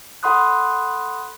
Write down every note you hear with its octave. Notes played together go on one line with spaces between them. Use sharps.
A4 F#5 B5 C6 D#6 F#6